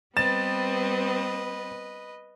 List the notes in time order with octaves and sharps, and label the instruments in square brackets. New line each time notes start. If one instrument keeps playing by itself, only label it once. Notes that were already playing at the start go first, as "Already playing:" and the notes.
[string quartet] G3 B3 C4 [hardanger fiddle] B4 D#5 [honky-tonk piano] A6 E7